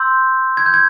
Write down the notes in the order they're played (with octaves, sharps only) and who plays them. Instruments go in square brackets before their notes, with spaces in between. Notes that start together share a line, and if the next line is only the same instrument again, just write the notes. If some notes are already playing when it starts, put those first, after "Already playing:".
Already playing: [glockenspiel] C6 E6 G6
G#6
G6
G#6